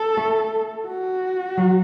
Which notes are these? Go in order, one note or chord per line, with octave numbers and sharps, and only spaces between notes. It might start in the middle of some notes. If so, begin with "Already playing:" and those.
Already playing: A4
A3
F#4
F#3